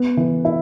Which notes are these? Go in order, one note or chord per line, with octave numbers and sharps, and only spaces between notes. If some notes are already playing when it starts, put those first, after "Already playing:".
Already playing: B3
E3
E4